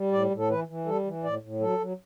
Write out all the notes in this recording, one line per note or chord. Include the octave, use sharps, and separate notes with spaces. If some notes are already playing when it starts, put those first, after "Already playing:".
Already playing: G3
A2 D5
A2
A4
E3 B4
E3
G3 A4
E3
A2 D5
A2
F#3 A4
F#3